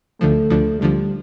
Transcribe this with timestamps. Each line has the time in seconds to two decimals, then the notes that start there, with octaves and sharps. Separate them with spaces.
0.21 D2 D3 F3 A3
0.50 D2 D3 F3
0.81 D2 D3 F3 G3